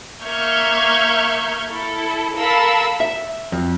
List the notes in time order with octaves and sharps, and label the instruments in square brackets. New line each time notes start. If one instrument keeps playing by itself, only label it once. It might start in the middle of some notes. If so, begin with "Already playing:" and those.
[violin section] A#3 E5 C#6 F6 G6 G#6
E4 A4
A4 A#4 F5 A5 B5 E6
[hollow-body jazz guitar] E5
F2